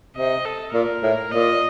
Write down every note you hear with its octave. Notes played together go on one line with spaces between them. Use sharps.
C3 D#5
A4
A#2 A#4
A2
A#2 D#5